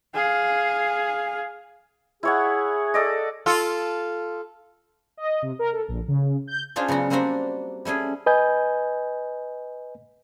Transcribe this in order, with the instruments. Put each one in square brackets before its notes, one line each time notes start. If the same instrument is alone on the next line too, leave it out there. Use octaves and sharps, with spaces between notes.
[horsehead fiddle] G#4 F5
[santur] E4 C#5 F#5 [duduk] G#4
[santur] A4 D5 D#5
[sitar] F4 A4
[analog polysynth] D#5
C3
A#4
A4
A#1
C#3
G6
[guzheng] C#4 D4 F4 G#4 C5
C#3 F#3 B3 F#4
G3 A#3 C4 D4 F#4 C5
G3 A3 C#4 G#4
[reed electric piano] B4 D#5 G#5 G6